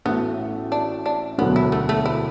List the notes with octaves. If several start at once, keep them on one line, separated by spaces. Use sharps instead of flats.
A1 A2 A3 B3 F#4
D4
D4
E1 D2 D3 F#3 B3
E4
A3
A3
E4